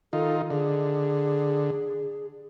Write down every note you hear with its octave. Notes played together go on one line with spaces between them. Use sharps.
D#3 D#4 F4 A4
D3 G#4